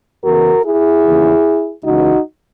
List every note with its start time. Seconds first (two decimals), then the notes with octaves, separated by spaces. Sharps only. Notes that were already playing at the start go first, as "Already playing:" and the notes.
0.24 E2 C#3 E3 F#4 A#4
0.64 E4 G#4
1.04 D#2 C#3 E3
1.84 C#2 C#3 E3 D#4 F#4